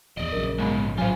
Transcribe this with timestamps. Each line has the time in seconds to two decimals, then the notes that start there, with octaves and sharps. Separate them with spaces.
0.17 D#1 E2 D5 D#5
0.32 A#1 F#2 C#3 A#4
0.59 C#2 G#2 G#3 B3 B5 C#6
0.98 A2 E3 F#3 F4 C5 F5 G#5